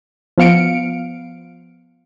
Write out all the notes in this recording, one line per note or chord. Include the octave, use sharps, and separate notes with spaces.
F3 B3 F5 C#7 D7